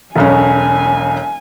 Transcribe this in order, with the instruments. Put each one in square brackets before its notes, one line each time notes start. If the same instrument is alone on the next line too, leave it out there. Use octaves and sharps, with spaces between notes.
[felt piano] E1 B1 C#4 [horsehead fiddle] G#5